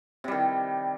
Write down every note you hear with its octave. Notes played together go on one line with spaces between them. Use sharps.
C3 D#3 G3